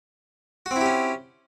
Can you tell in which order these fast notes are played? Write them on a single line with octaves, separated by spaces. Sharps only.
F#4 C4 E4 G4 C#4